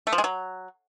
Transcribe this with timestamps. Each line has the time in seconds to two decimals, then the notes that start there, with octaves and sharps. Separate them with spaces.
0.07 A3
0.12 F3
0.18 G#3
0.24 F#3